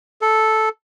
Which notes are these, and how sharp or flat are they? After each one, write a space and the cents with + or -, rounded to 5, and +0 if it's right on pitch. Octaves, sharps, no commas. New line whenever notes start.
A4 -5